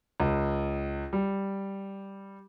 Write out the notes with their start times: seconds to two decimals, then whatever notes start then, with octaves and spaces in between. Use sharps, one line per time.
0.20 C#2
1.13 G3